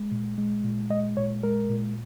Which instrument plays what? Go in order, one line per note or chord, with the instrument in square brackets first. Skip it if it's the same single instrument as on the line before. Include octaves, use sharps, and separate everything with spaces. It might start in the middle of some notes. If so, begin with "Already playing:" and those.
Already playing: [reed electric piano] G#3
A#2
G#3
A#2
G#3 D#5
A#2 C#5
G#3 A#4
A#2